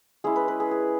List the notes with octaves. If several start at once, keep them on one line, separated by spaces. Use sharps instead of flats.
G#3 C#4 E4 G#4
B4
B4
G#4
G#4